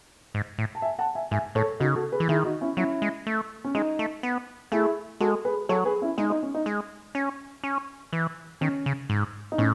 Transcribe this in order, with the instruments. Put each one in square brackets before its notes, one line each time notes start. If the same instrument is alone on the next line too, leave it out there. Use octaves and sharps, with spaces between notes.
[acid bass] G#2
A2
[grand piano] A5
E5 G#5
F#5 A5
E5 G#5
[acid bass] G#2 [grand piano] E5 G#5
[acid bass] A2 [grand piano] A4 C#5
[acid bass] C#3 [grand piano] D#4 F#4
[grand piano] F#4 A4
G#4 B4
[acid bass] E3
[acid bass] D#3 [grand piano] E4 G#4
[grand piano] D#4 F#4
C#4 E4
[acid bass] F#3 [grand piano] C#4 E4
[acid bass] G#3
A3
[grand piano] C#4
[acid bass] G#3 [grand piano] D#4
[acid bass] A3
B3
[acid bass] A3 [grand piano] E4 G#4
[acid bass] G#3 [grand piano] F#4 A4
[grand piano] G#4 B4
[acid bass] F#3 [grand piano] A4 C#5
[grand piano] G#4 B4
C#4 E4
[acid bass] G#3 [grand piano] D#4
[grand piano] D#4
C#4
D#4
[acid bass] G#3
C#4
C#4
E3
[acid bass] D#3 [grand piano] C#4
[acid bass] C#3
G#2
[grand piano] D#4
[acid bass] A2 [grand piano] C#4